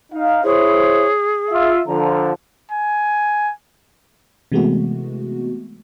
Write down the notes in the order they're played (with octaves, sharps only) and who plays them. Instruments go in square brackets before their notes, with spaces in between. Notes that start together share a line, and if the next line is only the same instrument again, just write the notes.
[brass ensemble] D#4 F5
[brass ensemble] E4 C5 C#5 [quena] G#4
[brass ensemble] F4 E5
[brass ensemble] D3 F3 [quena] A#5
[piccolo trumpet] G#5
[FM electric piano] C3 E3 G#3 A3 B3 F#4